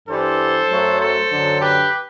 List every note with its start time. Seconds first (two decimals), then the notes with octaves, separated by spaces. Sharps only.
0.08 G2 E3 G3 A4 C5
0.69 F#2 F#3 A3
1.00 A4 C5
1.30 F#2 D3 F#3
1.61 G4 B4